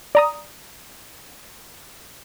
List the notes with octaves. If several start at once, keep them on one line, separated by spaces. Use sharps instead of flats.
D5 A#5 D#6